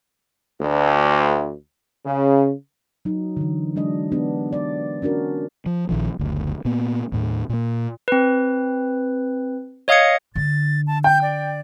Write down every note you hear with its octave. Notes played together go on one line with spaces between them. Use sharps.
D2
C#3
F#3 D#4
D3 E3
F#3 G#3 D4 D#5
B3 D4 G4
D5
C#4 D4 F#4 A#4
F3
A#1 D#3 F3
F#1 D2
A#2 A#3 B3
D#2 A2
A#2 A#3
C4 B4
C#5 D#5 F5 D#6 G#6 C#7
D3 A6
A5
G5 G6
D5